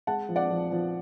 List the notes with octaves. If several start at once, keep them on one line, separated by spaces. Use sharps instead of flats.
G#3 F#5 A5
F3
D5 F#5
F3
F3